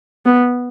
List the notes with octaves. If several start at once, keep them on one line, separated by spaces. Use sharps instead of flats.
B3